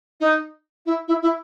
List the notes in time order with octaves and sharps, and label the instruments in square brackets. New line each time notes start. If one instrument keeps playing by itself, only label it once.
[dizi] D#4
E4
E4
E4